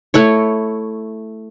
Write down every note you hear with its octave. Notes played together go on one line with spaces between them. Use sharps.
A3 E4 C#5